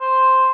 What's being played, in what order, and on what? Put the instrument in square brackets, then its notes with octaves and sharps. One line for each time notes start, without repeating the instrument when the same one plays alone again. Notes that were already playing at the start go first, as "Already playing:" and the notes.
[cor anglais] C5